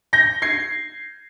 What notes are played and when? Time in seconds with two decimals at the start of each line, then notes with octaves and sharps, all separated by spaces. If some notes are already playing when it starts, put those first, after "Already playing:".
0.13 G6 A#6
0.42 G#6 C7